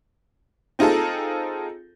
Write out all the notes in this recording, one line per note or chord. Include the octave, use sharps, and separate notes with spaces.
C4 D#4 F4 G#4 A4